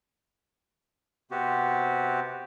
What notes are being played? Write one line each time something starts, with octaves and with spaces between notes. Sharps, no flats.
C3 B3 C4 F#4 G4